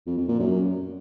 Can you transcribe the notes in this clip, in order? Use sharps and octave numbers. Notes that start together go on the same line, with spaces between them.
F2
F2
A#2
F#2